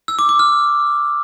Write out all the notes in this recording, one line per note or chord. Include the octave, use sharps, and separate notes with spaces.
E6
D6
D6
F6